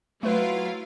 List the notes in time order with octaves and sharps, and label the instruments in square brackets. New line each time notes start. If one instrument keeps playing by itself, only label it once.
[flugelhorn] F#3 [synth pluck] A3 B4 [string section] E4 F4 F5